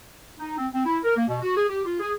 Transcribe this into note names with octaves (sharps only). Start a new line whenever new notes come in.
D#4
C4
C4
E4
A#4
A#3
B2
F#4
G#4
G4
F4
G#4